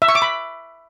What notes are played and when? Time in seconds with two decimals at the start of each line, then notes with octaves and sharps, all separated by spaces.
0.02 E5
0.09 C#6
0.15 D6
0.22 B5